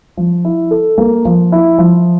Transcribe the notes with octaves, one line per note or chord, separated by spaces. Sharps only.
F3
E4
A4
A#3
F3
E4
F3